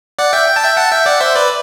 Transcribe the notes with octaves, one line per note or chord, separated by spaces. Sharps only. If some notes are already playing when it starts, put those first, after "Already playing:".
D5 F#5
E5 G5
G5
A5
E5 G5
F#5 A5
E5 G5
D5 F#5
C5 E5
B4 D5